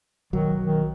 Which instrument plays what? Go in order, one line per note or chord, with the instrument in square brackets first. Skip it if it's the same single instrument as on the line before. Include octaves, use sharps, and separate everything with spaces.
[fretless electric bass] B1 F#3 [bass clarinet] D#3
[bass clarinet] D#3